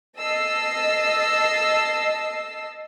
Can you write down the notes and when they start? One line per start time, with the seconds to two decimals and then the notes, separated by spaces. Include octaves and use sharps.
0.18 D#5 A5 E6 C7